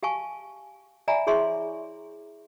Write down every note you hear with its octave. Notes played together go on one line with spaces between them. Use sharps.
G4 F5 G#5 A5 C#6
D5 E5 G#5 A#5 B5
E4 G#4 C#5 E5 C6 C#6